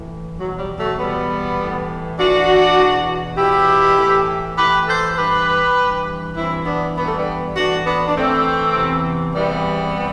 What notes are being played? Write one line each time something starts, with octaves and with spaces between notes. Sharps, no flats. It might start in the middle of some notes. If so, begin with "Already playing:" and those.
Already playing: A2 E3
E2 B2 F#3
F#3
G3
F#3 A3
E2 B2 G3 B3
A2 E3
A2 E3 D4 F#4
E2 B2
E2 B2 E4 G4
A2 E3
A2 E3 G4 B4
A4 C5
G2 E3 G4 B4
G2 E3
G2 E3 C4 E4
B3 D4
G2 E3 B3
A3
G3 B3
A2 E3 D4 F#4
B3 D4
D4
A2 E3 A3 C4
E2 C3 E3
E2 C3 E3 G3 B3
C3 E3